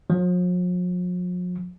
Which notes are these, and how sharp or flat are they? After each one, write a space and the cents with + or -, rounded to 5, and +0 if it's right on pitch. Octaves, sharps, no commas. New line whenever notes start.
F3 +45